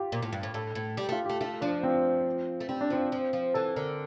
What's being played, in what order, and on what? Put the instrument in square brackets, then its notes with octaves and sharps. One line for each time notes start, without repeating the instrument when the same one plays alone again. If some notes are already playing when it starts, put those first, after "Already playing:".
Already playing: [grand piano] F4 G4
[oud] A#2
A2
G2
A2
[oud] A2 [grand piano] A4
[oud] A2
[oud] G3 [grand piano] G4
[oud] A3 [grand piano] F4
[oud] A3 [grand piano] G4
[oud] A3 [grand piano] F4
[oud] F3 [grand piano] D4
[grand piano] C4
[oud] A3
[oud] G3 [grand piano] C4
[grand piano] D4
[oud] F3 [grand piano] C4
[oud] F3
F3
[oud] E3 [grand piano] A4
[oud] D3 [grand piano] A#4